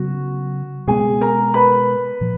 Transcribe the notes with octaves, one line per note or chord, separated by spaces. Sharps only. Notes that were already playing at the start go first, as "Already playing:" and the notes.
Already playing: C#3 F#3 B3 F#4
B2 G#3 B3 G#4 G#5
A#4 A#5
B4 B5
A#2 F3